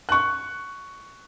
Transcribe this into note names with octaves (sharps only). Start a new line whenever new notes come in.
C#6 F#6